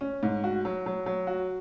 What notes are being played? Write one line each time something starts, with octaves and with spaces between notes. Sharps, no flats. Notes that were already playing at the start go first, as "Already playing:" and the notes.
C#4
G#2
F#4
F#3
F#3
F#3
F#4